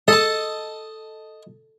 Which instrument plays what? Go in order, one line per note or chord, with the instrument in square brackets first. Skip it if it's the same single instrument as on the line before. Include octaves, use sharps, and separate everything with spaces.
[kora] A4 [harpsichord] D#5 A5